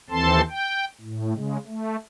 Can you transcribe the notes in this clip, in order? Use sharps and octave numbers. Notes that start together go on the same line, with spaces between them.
D#2 E3 C4 A4 A5 C6
G5
A2
C#3 G#3
A3